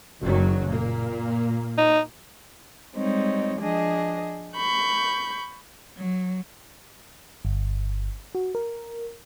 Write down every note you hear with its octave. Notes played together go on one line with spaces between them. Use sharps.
F#1 D#3 F#3
A#2 A#3
D#4
G3 G#3 C4 D#4 C#5
F3 D4 G#4 D#5
B5 C#6 G6
F#3
G1
F#4
A#4